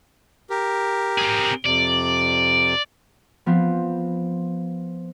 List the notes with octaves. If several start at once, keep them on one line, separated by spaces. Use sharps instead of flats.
G4 A#4
C4 G#4
F2 C3 D5
F3 B3 C4